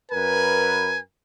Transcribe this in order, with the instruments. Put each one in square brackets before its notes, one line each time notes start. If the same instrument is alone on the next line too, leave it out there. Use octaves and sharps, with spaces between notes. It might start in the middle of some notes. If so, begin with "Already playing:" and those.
[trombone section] F#2 A#4 B4 [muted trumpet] G#5